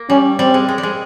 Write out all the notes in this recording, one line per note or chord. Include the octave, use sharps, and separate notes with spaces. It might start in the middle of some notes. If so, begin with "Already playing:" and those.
Already playing: A#3
G3 C#4
G3 C4
G#3
G#3
G3
G#3